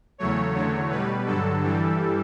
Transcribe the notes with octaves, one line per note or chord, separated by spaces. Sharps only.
E2 C#3 F#3 A3 C#5
E2 D3 F#3 A3
B2 G3 B4
G2 D3 F#3 A4
G2 E3 G3